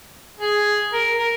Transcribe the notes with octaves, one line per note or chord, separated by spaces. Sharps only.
G#4
A#4
A#4